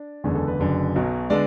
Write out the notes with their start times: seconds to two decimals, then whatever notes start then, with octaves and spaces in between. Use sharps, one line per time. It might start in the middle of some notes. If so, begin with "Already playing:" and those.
Already playing: D4
0.24 F#1 E2 D3 G#3 B3 C#4
0.35 A4
0.48 B4
0.60 F#1 F#2 D3
0.96 B1 B2 F#3
1.30 D3 G#3 B3 D5